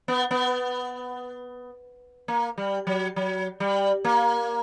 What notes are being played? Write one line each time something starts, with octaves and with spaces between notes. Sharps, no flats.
B3
B3
A#3
G3
F#3
F#3
G3
A#3